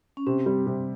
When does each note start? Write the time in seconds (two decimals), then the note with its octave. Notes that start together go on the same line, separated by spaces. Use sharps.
0.17 C#4
0.26 C3 C4
0.46 G3
0.67 C3